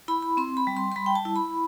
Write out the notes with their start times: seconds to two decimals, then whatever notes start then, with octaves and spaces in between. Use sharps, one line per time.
0.08 E4 B5
0.22 B5
0.37 C4 C6
0.57 B5
0.67 G3
0.77 C6
0.92 C6
0.96 G3 B5
1.06 G5
1.15 A5
1.25 E4
1.36 B5